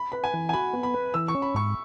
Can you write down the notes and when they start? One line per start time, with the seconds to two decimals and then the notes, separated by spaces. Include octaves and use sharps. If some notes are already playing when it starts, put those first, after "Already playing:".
Already playing: B5
0.12 B4 B5
0.24 G#5
0.34 E3
0.49 G#5
0.53 F#4 B5
0.73 B3
0.83 B5
0.94 B4
1.14 E3 E6
1.28 C#6
1.35 C#4
1.42 B5
1.54 G#2 C#6